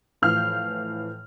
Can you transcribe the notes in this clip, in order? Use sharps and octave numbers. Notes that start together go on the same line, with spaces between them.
A2 E3 F3 F5 F6 G6